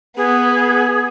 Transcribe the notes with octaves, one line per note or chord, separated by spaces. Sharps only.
B3 G#4